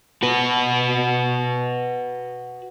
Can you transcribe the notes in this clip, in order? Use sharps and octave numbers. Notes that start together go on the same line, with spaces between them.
F#4 B4